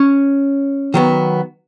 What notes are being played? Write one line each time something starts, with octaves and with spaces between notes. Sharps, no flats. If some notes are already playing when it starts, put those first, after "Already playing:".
Already playing: C#4 C#5
D#3 F#3 B3